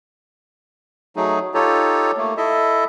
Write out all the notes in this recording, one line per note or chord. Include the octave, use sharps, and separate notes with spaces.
F#3 A3 D#4 G#4
D#4 F4 G4 A4 C#5
A3 A#3
E4 A4 D#5 E5